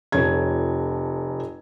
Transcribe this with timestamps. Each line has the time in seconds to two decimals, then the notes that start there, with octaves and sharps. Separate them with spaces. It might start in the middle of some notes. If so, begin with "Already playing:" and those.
0.12 F1 F2 C#5 G#6